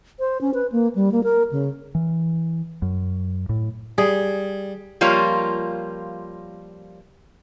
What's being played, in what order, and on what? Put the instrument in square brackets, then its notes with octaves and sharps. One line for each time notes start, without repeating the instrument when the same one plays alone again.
[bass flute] C5
C#4
B4
A#3
G3
A#3
A#4
C#3
[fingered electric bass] E3
F#2
A2
[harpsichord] G3 [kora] G#4
[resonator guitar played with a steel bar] F3 G3 A#3 F4 C#5